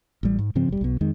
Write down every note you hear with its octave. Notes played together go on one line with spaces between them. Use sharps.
A1 G3
G#2
G#2 C#3 F3 C4
E1 G3
B1 B2
F2 D#3 G#3